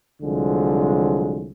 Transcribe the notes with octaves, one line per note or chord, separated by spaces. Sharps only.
C2 D3 F3 F#3 G#3